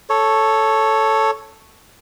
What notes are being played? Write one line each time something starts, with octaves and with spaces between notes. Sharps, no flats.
A4 C#5